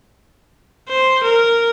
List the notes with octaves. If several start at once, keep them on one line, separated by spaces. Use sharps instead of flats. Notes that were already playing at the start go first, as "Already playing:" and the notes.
C5
A#4